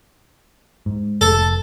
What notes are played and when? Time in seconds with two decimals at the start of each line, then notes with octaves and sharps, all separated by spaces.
0.86 G#2
1.21 F1 A4